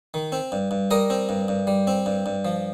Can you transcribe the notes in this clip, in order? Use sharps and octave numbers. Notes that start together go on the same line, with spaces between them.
D#3
C4
G2
G2
G3 A#4 D#5
C4
G2
G2
G3
C4
G2
G2
F3